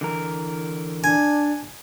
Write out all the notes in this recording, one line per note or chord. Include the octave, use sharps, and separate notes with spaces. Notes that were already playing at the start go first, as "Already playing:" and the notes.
D3 E3 A#4
D4 G#5